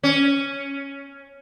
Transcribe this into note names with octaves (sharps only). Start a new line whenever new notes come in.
C#4